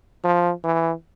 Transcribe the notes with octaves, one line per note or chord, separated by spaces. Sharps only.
F3
E3